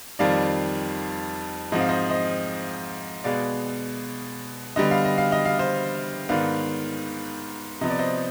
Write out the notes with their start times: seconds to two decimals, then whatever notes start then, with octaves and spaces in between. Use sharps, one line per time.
0.19 F2 D#3 G3 D5 F5
1.72 G#2 F3 C4 D#5
1.80 F5
1.89 C5 D#5
2.10 C5 D#5
3.24 B2 G#3 B3 D5 F5
4.76 D3 G3 B3 D#5
4.91 F5
5.05 D#5
5.18 F5
5.32 D#5
5.45 F5
5.59 C5 D#5
6.29 G#2 D#3 B3 D5 F5
7.81 C3 F3 B3 D#5
7.90 D5
7.99 C5 D#5